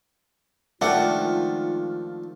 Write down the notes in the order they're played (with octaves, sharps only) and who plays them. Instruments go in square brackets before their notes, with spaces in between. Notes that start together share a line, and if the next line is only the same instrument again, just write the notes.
[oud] D#3 F3 G#3 [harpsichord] A3 D4 [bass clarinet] F4 [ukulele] F#5 G5